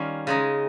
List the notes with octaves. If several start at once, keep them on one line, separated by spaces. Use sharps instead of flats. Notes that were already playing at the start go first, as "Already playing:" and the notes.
Already playing: D#3 G3 C#4 F4
C#3 G#3 D#4